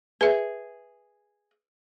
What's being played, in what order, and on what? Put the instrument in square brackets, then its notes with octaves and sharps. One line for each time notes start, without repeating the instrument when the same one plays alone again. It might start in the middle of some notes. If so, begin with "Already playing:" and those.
[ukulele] G#4 [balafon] B4 E5